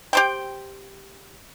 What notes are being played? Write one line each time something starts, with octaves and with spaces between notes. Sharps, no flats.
G4 C5 G5